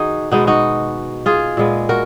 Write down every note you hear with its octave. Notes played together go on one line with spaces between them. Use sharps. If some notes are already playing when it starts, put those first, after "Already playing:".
Already playing: D#3 D#4 F#4 G#4
B2 G#3 B3 D#4 F#4
D#4 F#4
F4 G#4
A#2 G#3 B3
F#4 A#4